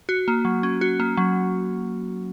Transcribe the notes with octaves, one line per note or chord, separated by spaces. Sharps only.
F#4
A#3
F#3
C#4
F#4
A#3
F#3